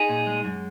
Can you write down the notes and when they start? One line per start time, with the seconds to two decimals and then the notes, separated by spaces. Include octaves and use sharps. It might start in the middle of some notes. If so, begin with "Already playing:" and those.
Already playing: D#4 G#4
0.09 A#2
0.27 G#3
0.44 F#2